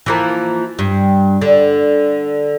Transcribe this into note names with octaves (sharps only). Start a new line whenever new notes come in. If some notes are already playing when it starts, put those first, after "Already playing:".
E3 F3 A#3
G2
D3